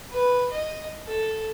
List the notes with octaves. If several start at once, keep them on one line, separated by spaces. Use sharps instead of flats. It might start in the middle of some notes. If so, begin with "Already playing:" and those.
B4
D#5
A4